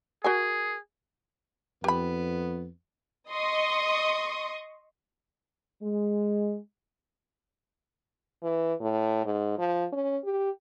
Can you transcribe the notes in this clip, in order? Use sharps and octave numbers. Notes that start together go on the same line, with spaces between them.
F#4 G#4 A#4 G#5
F2 B3 G4 B5
D#5 C6 C#6 D#6
G#3
E3
A2
G#2
F3
C#4
G4